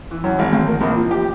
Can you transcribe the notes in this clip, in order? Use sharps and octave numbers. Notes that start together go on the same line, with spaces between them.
E3
F#2
G#1
D2
A#4
A#1
F3
G4